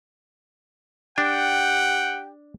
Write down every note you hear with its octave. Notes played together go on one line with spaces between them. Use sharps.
D4 G4 F#5 G5